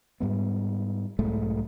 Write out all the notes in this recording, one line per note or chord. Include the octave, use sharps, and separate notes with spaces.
G#2 G3 B3
B1 G#2 G#3 A3